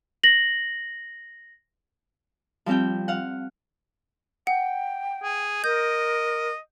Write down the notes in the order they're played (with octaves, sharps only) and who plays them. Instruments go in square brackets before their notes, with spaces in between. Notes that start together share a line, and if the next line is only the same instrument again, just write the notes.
[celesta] A#6 F#7
[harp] F3 G3 C4 G4 G5
F5 F#5
[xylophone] F#5 [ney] G5
[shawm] G#4
[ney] A#4 [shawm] D#5 [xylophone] G6